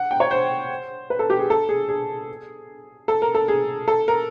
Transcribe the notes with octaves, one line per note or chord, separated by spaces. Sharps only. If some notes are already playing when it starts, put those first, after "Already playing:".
Already playing: F#5
G5
C#5
C5
B4
A4
G4
G#4
A4
G#4
G#4
A4
A#4
A4
G#4
A4
A#4